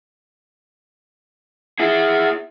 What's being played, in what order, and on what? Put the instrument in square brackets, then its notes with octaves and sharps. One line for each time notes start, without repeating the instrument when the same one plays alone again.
[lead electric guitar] E4 G#4